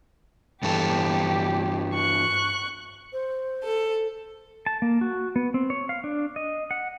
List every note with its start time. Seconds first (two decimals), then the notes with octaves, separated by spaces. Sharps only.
0.63 G2 E3 G4 A4
1.93 C#6 F#6
3.13 C5
3.64 A4
4.66 A5
4.82 A#3
5.01 F#4
5.36 B3
5.54 C4
5.70 C#5
5.89 F5
6.04 D4
6.36 D#5
6.71 F#5